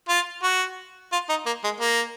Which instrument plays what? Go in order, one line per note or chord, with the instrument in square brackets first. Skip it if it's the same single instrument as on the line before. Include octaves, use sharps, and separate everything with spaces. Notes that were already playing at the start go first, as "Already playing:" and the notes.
[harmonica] F4
F#4
F4
D#4
A#3
G#3
A#3